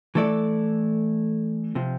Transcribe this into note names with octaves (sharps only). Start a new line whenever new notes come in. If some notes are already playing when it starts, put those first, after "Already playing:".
E3 A3 E4 A4 D5
C3 F3